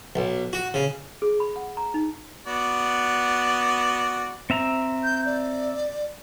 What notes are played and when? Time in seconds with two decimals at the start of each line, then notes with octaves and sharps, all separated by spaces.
0.16 B1
0.53 F#4
0.74 C#3
1.22 G#4
1.40 B5
1.56 F#5
1.77 A#5
1.94 D#4
2.47 B3 F#4 D5
4.50 C4 E5 A#5
5.04 G6
5.26 D5